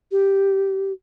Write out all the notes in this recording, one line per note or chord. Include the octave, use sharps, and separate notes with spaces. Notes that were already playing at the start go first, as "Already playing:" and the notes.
G4